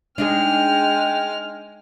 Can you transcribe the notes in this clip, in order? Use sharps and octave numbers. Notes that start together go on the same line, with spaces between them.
G#3 D4 D#4 G#4 G5 F6